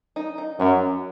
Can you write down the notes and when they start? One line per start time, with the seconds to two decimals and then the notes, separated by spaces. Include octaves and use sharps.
0.16 D#4
0.38 D#4
0.59 F#2 C#4